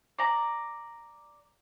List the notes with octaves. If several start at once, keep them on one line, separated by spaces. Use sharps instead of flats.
D5 A#5